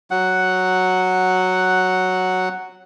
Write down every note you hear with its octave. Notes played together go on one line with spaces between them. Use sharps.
F#3 F#5